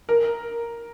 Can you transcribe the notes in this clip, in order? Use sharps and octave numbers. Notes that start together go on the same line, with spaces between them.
A#4